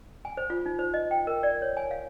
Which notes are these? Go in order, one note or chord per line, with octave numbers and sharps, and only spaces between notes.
G#5
C5
F4
D#4
C5
D#5
G5
A#4
D5
C#5
G#5
F5